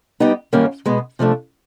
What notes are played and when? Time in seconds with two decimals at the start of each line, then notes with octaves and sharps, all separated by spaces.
0.20 G3 B3 D#4 G4
0.53 F#2 D#3 G3 A#3 C#4
0.85 B2 G#3 B3
1.19 C3 F3 A3 D4